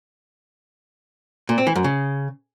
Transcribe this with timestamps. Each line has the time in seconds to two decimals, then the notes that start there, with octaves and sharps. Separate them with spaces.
1.49 A#2
1.58 C4
1.67 E3
1.76 F#2
1.84 C#3